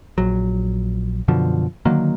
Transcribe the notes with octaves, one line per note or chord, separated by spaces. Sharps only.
A#1 F#3
F#2 B2 D3 F3
D3 D#3 F#3 A#3